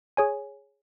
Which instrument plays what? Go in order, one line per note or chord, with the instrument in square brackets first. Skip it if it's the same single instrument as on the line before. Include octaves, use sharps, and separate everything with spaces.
[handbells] G#4 C#5 G#5